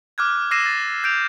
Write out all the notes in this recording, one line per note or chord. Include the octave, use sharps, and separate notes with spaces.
D6 F6 F#6 G#6
D6 E6 A#6 C7 D#7 E7
A6
G6 D7 F7